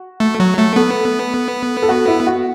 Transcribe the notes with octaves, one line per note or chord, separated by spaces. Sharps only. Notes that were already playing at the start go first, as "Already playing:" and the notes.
Already playing: F#4
A3
F#3
A3
B3 A4
A4
F#4
E4
F#4